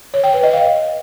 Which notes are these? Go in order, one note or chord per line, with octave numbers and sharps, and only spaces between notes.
C#5
G5
B4
D#5
F5